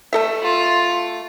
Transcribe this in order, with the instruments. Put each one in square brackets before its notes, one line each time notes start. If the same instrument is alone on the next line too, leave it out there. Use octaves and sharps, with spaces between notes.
[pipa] A3 A4 E5
[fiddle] F4